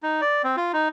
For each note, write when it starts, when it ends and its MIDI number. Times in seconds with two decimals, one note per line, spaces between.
0.03 0.21 63
0.21 0.42 74
0.44 0.56 60
0.57 0.72 65
0.73 0.88 63